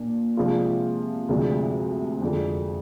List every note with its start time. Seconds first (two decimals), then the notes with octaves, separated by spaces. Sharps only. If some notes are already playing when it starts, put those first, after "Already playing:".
Already playing: A#2 D4
0.37 C3 F3 G#3 D4 F4
1.29 D2 C3 F3 G#3 D4
2.21 F2 D3 G#3